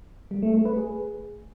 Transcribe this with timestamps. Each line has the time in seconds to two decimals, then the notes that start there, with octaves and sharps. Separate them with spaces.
0.31 G3
0.42 A3
0.54 A3
0.65 B4
0.77 G#4